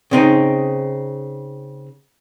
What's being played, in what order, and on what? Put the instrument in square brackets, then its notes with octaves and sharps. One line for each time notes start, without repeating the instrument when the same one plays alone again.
[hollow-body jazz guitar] C#3 C4 D#4